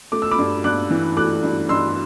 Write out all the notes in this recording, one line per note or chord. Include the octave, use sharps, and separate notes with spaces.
A3 D6
E6
B5 D6
G2
G2 D6 F#6
E3
A3 D6 F#6
G2
G2 C6 E6